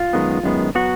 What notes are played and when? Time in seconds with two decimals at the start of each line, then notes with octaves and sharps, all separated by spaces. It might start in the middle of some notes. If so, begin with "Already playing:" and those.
Already playing: F4
0.13 F#2 D#3 G#3 B3
0.43 F#2 D#3 G#3 B3
0.75 F#3 B3 F#4